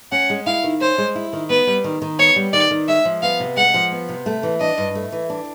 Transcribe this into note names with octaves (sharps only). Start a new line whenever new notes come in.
C#4 F#5
G#3
E4 F5
D#3
C#4 C5
G#3
E4
D#3
B3 B4
G3
D#3
D#3
B3 C#5
G3
D#3 D5
D#3
G#3 E5
F3
B3 F5
C3
G#3 F#5
F3
B3
C3
A3
E3
D4 D#5
G2
A3
E3
D4